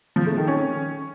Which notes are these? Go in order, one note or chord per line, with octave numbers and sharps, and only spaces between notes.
F3
A3
D#3
C#4